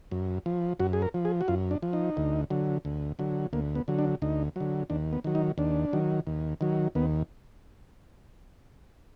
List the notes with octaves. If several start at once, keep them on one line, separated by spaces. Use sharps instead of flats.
F#2
F3
F#2 F#4
G#4
A#4
F3
G#4
F#4
F#2 F4
D4
F3
D#4
D2
D3 F#3
D2
D3 F#3
D2 A#3
B3
D3 F#3
D4
D2 D#4
D3 F#3
D#2 D4
B3
D#3 F#3
D#4
D#2 D4
D#3 F#3
D#2
D#3 F#3
D#2 B3